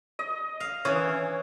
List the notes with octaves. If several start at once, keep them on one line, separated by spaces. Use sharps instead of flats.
D#5
F5
E3 C#4 C#5 D#6